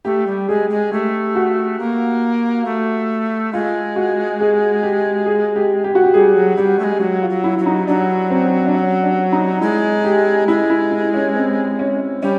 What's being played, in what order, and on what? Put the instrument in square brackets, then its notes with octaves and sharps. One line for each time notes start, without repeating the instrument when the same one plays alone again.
[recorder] A3 [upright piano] G4
[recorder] G3
[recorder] G#3 [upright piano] G#4
[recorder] G#3
[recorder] A3 [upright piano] G4
[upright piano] F#4
[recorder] A#3
A3
[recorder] G#3 [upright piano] F4
[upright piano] F#4
G#4
G4
G#4
G4
G4
F#4
G4
[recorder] G3 G#3 [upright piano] G#4
[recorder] F#3
[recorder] G3 [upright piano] G4
[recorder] A3
G#3
[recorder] F#3 [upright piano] F#4
[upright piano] F4
[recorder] F#3
[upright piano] E4
[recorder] F#3
[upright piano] D#4
[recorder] F#3 [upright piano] D4
[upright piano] C4
D4
C#4
D4
D#4
[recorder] G#3 [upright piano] E4
[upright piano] G4
[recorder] G#3 [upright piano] E4
[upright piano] E4
E4
C#4
C4
C#4
[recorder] G3 [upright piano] C#4